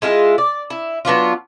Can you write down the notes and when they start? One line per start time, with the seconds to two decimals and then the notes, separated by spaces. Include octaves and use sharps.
0.02 G#3 E4 F4 G#4
0.38 D5
0.70 E4
1.05 F#3 B3 D4 F4